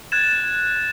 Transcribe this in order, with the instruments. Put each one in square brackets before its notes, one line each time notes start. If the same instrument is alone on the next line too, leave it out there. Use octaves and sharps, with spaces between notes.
[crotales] F#6 G#6 A6 E7